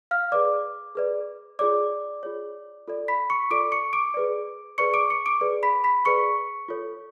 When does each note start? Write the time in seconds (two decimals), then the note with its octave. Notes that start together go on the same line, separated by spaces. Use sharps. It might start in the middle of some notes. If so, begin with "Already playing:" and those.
0.11 F5 F6
0.32 G#4 B4 D5 D6
0.95 G#4 B4 D5
1.59 F4 G#4 C#5 D5 D6
2.23 F4 G#4 C#5
2.88 F4 A4 D5
3.08 B5 B6
3.30 C#6 C#7
3.51 F4 A4 D5 D6 D7
3.72 C#6 C#7
3.93 D6 D7
4.14 G#4 B4 D5
4.78 G#4 B4 D5 C#6 C#7
4.94 D6 D7
5.10 C#6 C#7
5.26 D6 D7
5.41 G#4 B4 D5
5.63 B5 B6
5.84 B5 B6
6.05 G#4 B4 D5 C#6 C#7
6.68 F4 A4 C#5